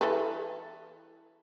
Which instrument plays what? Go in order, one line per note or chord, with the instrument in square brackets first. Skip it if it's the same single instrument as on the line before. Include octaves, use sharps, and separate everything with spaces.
[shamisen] E3 A4 B4